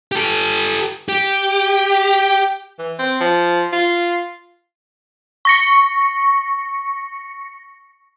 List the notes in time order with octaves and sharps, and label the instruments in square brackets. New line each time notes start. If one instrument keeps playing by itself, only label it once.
[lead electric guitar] G4 A4
[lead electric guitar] G4 [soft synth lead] G5
[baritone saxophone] E3
C4
F3
F4
[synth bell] C#6 A#6 C#7